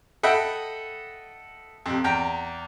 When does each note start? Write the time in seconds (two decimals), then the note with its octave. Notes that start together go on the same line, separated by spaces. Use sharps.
0.23 A4 D#5 E5 F#5 G5 B5
1.86 F2 C3
2.04 E2 G5 A#5